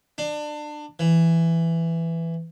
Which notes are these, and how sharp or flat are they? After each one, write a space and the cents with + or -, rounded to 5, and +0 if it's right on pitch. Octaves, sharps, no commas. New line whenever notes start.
D4 +25
E3 +10